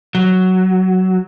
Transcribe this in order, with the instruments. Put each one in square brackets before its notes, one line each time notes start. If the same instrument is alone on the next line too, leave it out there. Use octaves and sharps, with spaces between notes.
[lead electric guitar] F#3